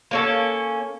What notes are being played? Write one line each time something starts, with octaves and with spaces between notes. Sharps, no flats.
A#3 C#4 A4